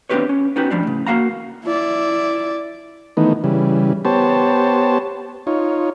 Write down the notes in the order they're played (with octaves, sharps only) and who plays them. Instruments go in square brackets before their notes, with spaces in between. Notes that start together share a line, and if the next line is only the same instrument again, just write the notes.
[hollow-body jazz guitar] B3 C4 D4 G4 B4 C#5
C#4
B3 C#4 D#4 F#4 G4 B4
G#2 F3 G3 D4
A2 C#3
A#3 F#4 F5 F#5 A#5
[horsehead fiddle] E4 D5
[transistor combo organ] D#3 E3 A3 B3 D#4
C#3 E3 G3
B3 G4 C5 C#5 A5
D#4 F4 C#5